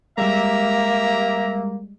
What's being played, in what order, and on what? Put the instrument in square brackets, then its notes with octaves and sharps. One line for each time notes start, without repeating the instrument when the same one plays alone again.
[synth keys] G3 G#3 [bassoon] A#3 [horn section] G4 E5 A#5